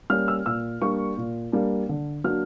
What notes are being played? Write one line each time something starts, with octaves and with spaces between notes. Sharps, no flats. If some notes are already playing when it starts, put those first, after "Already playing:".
G3 A#3 C#4 F6
E6
A#2 E6
G3 A#3 D4 C#6
A#2
G3 A#3 D4
D3
F#3 A#3 D4 F6